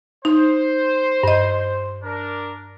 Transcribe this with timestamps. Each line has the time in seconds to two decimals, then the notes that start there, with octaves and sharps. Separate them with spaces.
0.25 D#4 C5
1.23 G2 D#5
2.03 D4 A#4